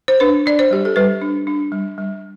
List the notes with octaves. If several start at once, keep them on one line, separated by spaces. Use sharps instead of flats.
C5
D4 B4
D4 D5
C5
G3 G4
A4
G3 B4
D4
D4
G3
G3